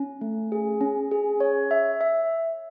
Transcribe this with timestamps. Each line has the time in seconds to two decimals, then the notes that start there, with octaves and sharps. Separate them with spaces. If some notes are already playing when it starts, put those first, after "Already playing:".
Already playing: C#4
0.21 A3
0.52 G#4
0.81 C#4
1.11 G#4
1.40 C#5
1.71 E5
2.01 E5